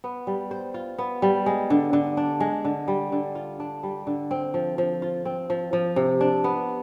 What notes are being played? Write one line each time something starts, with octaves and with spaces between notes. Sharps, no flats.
B3
G3
C5
F4
B3
G3
G#3
D3
D3
D4
G#3
D3
G3
D3
F4
D4
G3
D3
C4
F3
F3
F4
C4
F3
F3
C3
D4
B3